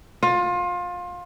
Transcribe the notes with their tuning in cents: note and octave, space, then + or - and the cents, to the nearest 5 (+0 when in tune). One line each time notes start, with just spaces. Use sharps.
F4 +25